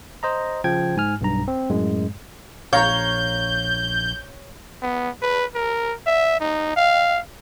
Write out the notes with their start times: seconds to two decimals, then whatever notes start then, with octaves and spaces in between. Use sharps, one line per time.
0.23 C5 D#5 A#5
0.64 C#3 F3 G5 G#6
0.97 G#2 G#5 F6
1.21 B1 G2 A#5
1.48 C4
1.70 F#2 A2 G#3
2.73 A#1 C#5 F5 A#5 C#6 G6
4.82 B3
5.22 B4
5.55 A#4
6.07 E5
6.40 D#4
6.77 F5